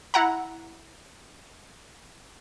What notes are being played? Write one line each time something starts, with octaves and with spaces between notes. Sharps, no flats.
E4 F#5 A#5